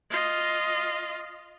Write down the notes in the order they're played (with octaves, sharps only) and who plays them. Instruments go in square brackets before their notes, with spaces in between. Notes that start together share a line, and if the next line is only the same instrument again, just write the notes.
[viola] F4 D#5